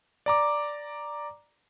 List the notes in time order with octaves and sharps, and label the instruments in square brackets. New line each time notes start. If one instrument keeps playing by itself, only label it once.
[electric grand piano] D5 A#5 D6